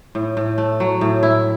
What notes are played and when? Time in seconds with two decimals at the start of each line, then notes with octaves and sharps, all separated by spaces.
0.15 A2
0.37 A2
0.58 A3
0.80 F#3
1.01 A2
1.23 E4